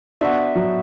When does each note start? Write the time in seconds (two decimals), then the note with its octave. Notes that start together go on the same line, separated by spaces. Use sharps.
0.21 B3 D4 F#4 C5 E5
0.55 F#3